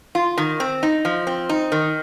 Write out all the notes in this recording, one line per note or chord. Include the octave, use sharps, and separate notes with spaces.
F4
D#3
C4
D#4
F3
C4
D#4
D#3